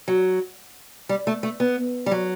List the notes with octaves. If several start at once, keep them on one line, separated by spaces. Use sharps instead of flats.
F#3
G3
A3
A3
B3
G3
F#3